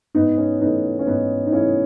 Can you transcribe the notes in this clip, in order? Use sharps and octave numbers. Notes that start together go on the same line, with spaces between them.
G#2 B3 D#4
C#4
E3 A3 B3 D#4
C#4
G#2 B3 D#4
D#4
E3 A3 C#4 E4